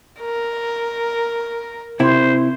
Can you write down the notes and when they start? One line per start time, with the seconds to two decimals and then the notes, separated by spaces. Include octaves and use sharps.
0.20 A#4
2.00 C3 E4 C5